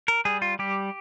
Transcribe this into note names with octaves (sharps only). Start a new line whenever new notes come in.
A#4
G3 G#4
F4
G3 G4